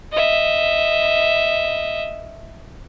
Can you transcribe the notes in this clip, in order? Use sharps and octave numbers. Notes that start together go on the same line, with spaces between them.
D#5 E5